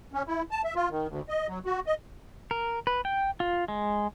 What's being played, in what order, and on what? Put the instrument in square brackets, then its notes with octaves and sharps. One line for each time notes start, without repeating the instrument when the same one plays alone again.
[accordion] C#4
E4
A5
E5
F4
D#3
D2
D#5
F#3
F#4
D#5
[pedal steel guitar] A#4
B4
G5
F4
G#3